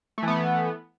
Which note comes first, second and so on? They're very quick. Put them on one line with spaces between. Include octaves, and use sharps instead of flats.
A3 E3 B3